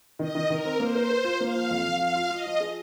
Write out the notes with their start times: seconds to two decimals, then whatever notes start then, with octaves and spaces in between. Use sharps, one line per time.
0.19 D#3 D#5
0.35 D#3
0.50 D#3 A#4
0.65 C4
0.80 A#3 C5
0.95 A#4
1.10 A#4
1.24 F4
1.40 A#3 F5
1.55 F3
1.70 F2
1.86 F2
2.00 F3 F5
2.15 F4
2.31 F4 D#5
2.46 F3
2.60 G#4